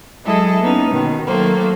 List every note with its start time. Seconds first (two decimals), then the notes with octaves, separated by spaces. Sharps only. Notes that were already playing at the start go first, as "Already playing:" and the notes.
0.25 F#3 G#3 E4 G#4 A4 D#5
0.61 A#3 B3 C#4 D#4
0.91 B2 D#3
1.27 D#3 F#3 A3 A#3 C5